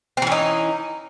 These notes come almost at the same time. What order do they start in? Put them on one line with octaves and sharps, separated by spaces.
C4 E3 C#4 D#4